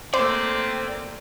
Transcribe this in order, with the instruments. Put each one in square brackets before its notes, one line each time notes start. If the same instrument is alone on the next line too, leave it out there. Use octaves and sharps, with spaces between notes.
[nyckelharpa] A3 A#3 [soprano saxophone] C4 [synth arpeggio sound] C5 [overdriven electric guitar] D5